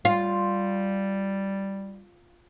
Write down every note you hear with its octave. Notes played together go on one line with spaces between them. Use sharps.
G3 F4